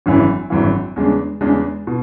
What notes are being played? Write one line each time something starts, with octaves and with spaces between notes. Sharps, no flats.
G#1 F#2 C#3 E3
G#1 F#2 C#3 E3
E2 C#3 G#3 D4
E2 C#3 G#3 D4
B2